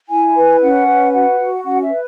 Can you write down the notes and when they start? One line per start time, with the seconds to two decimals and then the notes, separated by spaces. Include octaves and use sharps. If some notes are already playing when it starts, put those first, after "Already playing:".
0.09 E4 G#5
0.36 B4
0.62 C#4 F#5
0.88 B4
1.13 F#4 F#5
1.39 F#4
1.64 C#4 F#5
1.82 E5
1.91 B4